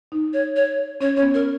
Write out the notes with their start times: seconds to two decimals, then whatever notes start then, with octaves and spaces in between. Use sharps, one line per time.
0.12 D#4
0.33 C#5
0.56 C#5
1.00 C#4 C#5
1.17 C#4 C#5
1.22 B3
1.34 A#4